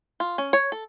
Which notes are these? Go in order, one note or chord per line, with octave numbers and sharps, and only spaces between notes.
F4
C#4
C#5
A4